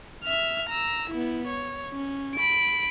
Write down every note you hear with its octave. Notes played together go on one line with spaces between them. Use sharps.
E5 F6
A#5 E6
B3 E4
C#5
C#4
B5 D7